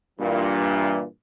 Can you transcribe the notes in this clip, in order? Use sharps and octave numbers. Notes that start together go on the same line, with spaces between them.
G2 A#2 E3